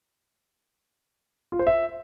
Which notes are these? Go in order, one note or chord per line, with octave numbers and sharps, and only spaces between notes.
F4
C5
E5